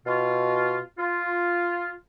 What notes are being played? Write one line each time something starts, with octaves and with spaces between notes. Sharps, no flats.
B2 F4
F4